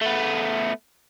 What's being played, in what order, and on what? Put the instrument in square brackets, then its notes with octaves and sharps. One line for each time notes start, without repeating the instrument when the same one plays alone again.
[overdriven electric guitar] A3 B3